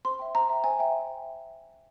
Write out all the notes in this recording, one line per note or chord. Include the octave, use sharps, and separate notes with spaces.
C5 C6
E5 G5
C5 A#5
E5 G5
C5 G#5
E5 G5